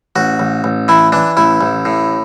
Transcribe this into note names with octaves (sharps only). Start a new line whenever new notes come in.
A1 F#4
A1
A1
E3 E4
E3 D4
A1 E4
A1
A2